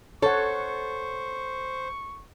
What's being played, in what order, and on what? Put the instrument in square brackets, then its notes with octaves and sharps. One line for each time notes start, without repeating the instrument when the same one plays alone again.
[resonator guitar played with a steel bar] A4 [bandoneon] C5 [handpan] C#5 F#5 [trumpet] C#6